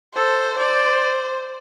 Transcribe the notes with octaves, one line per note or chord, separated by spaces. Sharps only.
A4 C5
C5 D5